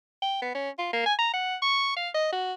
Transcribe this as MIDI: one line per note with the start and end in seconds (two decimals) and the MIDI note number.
0.22 0.40 79
0.42 0.54 59
0.55 0.70 61
0.78 0.90 65
0.93 1.02 58
1.06 1.14 80
1.19 1.31 82
1.33 1.56 78
1.62 1.95 85
1.97 2.09 77
2.14 2.33 75
2.33 2.53 66